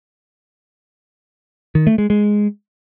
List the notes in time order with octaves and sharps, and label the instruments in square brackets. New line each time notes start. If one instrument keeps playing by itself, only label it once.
[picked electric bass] D#3
A3
G#3
G#3